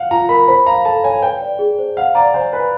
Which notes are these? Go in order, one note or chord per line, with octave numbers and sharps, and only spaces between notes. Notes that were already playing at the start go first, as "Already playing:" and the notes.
Already playing: F5 F#5
F4 A#5
A#4 B5
C5 B5
F5 A#5
A4 A5
C#5 G#5
B4 G5
D5
G#4
C5
F5 F#5
D5 A#5
C5 G#5
B4 G#5